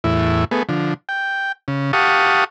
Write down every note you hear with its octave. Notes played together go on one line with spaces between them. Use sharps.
E2 A2 E4
A3 B3 G#4
D3 F3
G5
C#3
G4 F5 F#5 A5 C#6 D#6